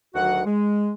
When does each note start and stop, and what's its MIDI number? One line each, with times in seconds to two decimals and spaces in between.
0.15 0.42 38
0.15 0.42 51
0.15 0.42 54
0.15 0.42 66
0.15 0.42 78
0.45 0.91 56